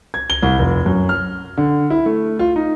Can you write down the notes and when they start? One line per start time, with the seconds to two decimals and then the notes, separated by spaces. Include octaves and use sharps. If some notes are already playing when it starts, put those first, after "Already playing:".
0.14 G#6
0.30 G7
0.42 C2
0.59 F1
0.86 F#2
1.09 F6
1.57 D3
1.90 E4
2.06 A3
2.39 F4
2.56 D#4